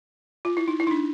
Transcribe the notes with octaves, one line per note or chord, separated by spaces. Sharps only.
F4
E4
D#4
E4
D#4
D4